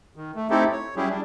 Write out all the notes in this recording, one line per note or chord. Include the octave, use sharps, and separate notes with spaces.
D#3
A3
A3 C4 D#4 E4 G4 A4
C#5
F#3 G3 C#4 E4 G4 G#4
G3 D4